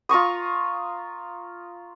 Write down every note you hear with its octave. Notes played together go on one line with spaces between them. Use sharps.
F4 A#5 C#6 D#6